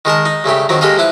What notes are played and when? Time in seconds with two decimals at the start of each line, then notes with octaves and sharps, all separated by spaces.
0.05 D#3 G#3 A#4 A5
0.26 D#4
0.44 G2 C#3 A3 G4
0.69 D#3 F3 F#3 C4
0.81 G#3 A#3 G4 A4 D#5 F5
0.98 F3 E4 B4